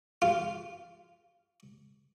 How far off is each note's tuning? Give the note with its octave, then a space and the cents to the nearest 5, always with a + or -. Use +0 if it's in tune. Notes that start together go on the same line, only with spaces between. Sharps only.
F4 -10